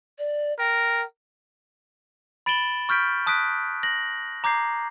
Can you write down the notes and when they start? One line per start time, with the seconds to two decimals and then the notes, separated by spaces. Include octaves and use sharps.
0.18 D5
0.59 A#4 G5
2.46 B5 A6 D7 E7 F#7 G7
2.89 C#6 F6 G6 B6 D7
3.27 A5 D#6 F#6 B6 D7
3.83 A#6 F#7
4.44 A#5 D6 G6 G#6 C7